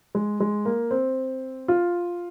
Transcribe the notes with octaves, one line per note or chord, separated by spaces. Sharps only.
G#3
G#3
A#3
C4
F4